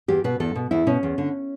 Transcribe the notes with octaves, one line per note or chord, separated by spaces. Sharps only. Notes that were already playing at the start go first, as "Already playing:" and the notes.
E2 G4
B2 B4
E2 A4
B2
E2 E4
B2 C#4
E2
D3